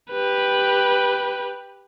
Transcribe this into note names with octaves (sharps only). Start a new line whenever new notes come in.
G4 B4